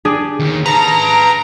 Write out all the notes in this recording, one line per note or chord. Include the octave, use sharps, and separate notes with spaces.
D4 G4 G#4
D#2 D#3
B4 A5 A#5
D7